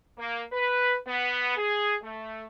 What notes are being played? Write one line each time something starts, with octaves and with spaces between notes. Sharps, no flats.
A#3
B4
B3
G#4
A3